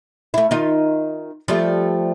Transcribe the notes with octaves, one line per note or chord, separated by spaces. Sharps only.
A3 E4
D#3 D#4 F4
F3 G3 A3